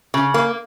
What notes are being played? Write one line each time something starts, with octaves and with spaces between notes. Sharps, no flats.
C#3
A#3